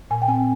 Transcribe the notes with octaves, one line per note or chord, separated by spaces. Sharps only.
A#2 G#5
G5
C4 G#5